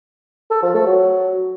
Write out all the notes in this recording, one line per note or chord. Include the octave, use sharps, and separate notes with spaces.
A4
F3
A3
F#3